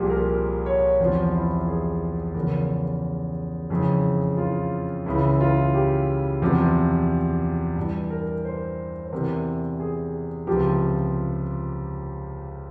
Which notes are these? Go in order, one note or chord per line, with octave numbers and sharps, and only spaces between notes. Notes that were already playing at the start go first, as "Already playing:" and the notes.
Already playing: C2 A#2 F3 G4 G#4
A#4
C#5
E2 C3 F3 C5
E4
G#4
E2 C#3 F3 A#4
F2 C#3 E3 G#4
F4
C#2 C#3 E3 E4
F4
G4
E2 C3 F3
G2 E3
A#4
C5
C5
E2 C3 E3 A#4
G#4
C#2 C3 F3 G4